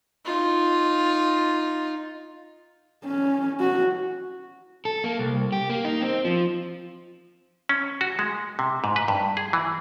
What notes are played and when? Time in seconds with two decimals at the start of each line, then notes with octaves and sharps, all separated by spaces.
0.25 D#4 F4
3.05 C#4
3.60 F#4
4.85 A4
5.04 A#3
5.19 C2
5.52 G4
5.70 A#3
5.85 D#4
6.02 C4
6.25 F3
7.69 C#4
8.01 F#4
8.19 G#3
8.59 C3
8.84 G#2
8.96 B4
9.08 G2
9.37 G#4
9.53 E3